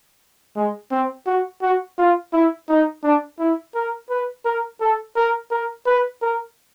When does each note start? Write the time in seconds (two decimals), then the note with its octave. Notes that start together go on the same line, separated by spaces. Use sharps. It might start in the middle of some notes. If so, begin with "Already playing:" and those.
0.56 G#3
0.91 C4
1.27 F#4
1.62 F#4
1.98 F4
2.33 E4
2.69 D#4
3.03 D4
3.39 E4
3.75 A#4
4.10 B4
4.45 A#4
4.81 A4
5.16 A#4
5.51 A#4
5.86 B4
6.22 A#4